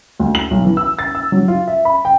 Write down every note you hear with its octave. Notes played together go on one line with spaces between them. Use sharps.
D2
F#7
B1
E3
E6
A6
E6
F#3
F4
E5
B5
G5